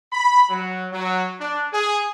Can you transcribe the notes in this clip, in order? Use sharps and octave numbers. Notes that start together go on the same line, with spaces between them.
B5
F#3
F#3
D4
G#4